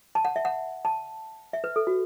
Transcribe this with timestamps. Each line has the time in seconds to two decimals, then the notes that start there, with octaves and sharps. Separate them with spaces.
0.15 A5
0.25 F#5
0.36 E5
0.45 F#5
0.85 A5
1.53 E5
1.64 B4
1.76 A4
1.87 F#4